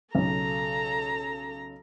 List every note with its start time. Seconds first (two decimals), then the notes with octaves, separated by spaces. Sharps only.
0.15 B1 C#3 A4 A#5